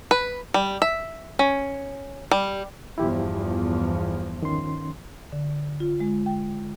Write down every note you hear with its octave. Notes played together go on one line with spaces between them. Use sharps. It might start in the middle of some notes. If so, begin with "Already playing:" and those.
B4
G3
E5
C#4
G3
E2 G2 F3 E4 G4
D#3 C#4 C6
D3
F4
G#3
G5